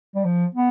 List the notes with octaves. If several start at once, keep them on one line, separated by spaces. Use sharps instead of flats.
G3
F3
B3